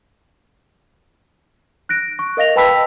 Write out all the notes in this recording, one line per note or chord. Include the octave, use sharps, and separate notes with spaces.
F#6 A#6 D7
C#6
A#4 D#5 F5 A#6 F7
B4 G5 A5 B5 E6 B6